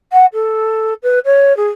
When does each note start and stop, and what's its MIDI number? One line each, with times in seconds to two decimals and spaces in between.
0.12 0.26 78
0.33 0.94 69
1.03 1.19 71
1.25 1.56 73
1.57 1.68 68